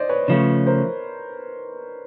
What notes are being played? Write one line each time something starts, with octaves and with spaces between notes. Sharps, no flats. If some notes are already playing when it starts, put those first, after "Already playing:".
Already playing: C5 D5 D#5
B4 C#5
C#3 F3 A3
A#4 C5